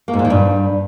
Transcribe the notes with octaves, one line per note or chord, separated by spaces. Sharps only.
A#3
G#2
A#2
D#3
G2